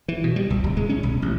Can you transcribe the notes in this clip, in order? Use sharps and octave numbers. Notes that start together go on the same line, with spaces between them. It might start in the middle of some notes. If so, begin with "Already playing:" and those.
E3
B2
G3
C2
D1
G#3
C#4
B1
A1